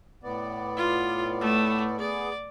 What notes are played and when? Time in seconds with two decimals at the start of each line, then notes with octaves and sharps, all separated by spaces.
0.23 A2 B3 D5
0.77 F4
1.41 A3
2.00 B3 G#4 D5